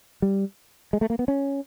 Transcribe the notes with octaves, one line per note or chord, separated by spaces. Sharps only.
G3
G#3
A3
A#3
B3
C#4